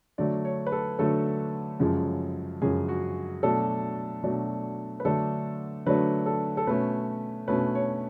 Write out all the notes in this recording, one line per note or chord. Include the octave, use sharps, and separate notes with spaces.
D3 F#3 A3 D5
C#5
B4
A4
D3 F#3 A3 A4
F#2 C#3 F3 G#3
F#2 C#3 F3 G#3 G#4
F#4
B2 F#3 A3 D4 A4
B2 F#3 A3 D4
B4
D3 F#3 A3 D4 A4
D3 F#3 A3 D4 B4
A4
A4
B2 A3 C#4 B4
B2 A3 C#4 B4
C#5